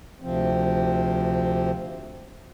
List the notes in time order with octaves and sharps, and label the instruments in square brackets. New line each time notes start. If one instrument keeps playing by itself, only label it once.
[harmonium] D2 C3 F3 C4